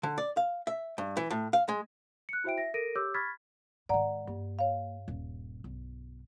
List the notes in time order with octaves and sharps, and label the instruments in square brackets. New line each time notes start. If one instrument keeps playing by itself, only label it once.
[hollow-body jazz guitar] D3
D5
F5
E5
G2
E3
A2
F5
G#3
[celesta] F#6 C#7
E4 F#4 C5 E5 G5 D7
E5 A#6
A4 A#4 A#6 D7 D#7
G4 C#5 D6 E6 G6
B5 C#6 F6 G#6 A6 B6
[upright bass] G#2 D#3 [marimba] D5 F#5 A#5
[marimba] G2 [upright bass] A#3
[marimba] C#5 F5
[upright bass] D#1
B1